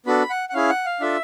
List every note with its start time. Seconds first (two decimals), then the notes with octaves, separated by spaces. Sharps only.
0.06 B3 D4 F#4 A4 B5
0.30 F#5
0.49 F#5
0.54 C#4 E4 G#4 F5
0.69 F#5
0.86 F5
1.01 D4 F4 A4 E5